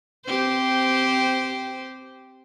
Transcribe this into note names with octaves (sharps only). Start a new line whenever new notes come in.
C4 G4 C5